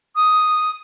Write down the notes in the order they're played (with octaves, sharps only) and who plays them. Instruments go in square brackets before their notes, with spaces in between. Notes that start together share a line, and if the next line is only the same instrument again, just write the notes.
[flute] D#6